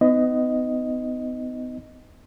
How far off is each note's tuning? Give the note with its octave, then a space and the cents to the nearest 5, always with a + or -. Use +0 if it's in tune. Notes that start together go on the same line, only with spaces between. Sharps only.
B3 +35 D#4 +5 D#5 +0